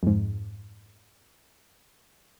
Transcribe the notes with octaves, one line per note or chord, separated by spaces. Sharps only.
F2 G#2